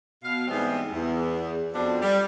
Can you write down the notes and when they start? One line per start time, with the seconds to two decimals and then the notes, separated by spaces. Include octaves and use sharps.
0.23 B2 F5
0.47 G#2 E3 G3 B3 C4
0.92 E2
1.73 F2 B2 F3 C4 D4
2.02 G3